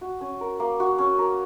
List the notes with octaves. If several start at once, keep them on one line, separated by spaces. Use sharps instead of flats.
F#4
C#4
A#4
A#3
F#4
C#4
A#4